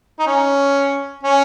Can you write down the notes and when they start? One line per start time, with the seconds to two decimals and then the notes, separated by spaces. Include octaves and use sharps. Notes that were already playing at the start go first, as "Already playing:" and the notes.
0.19 D#4
0.27 C#4
1.24 C#4